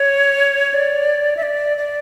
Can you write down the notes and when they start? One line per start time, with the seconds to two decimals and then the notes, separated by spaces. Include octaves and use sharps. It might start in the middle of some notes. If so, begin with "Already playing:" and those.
Already playing: C#5
0.74 D5
1.37 E5
1.43 D5
1.78 D5